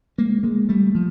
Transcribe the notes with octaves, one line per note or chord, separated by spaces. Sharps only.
G#3 A#3
G#3 A#3
G3 A3
F3